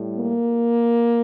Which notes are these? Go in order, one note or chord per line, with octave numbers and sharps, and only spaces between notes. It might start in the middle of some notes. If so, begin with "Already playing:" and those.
Already playing: A2 G3
A#3